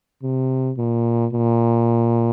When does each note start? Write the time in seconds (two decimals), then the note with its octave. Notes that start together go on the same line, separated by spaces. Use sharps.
0.23 C3
0.77 A#2
1.33 A#2